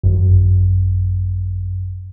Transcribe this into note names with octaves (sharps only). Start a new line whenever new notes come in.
G#1 F#2